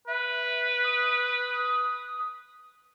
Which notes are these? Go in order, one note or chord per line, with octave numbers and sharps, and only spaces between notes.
B4 E5
D#6